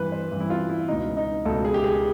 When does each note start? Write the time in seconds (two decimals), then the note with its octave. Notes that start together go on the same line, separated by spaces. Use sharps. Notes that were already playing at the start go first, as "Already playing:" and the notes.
Already playing: G2 E3 B4
0.12 C5
0.31 G2 E3
0.40 E4
0.50 F4
0.70 E4
0.88 C#2 B2 D#4
1.17 D#4
1.45 C#2 A4
1.48 B2
1.65 G#4
1.74 G4
1.84 G#4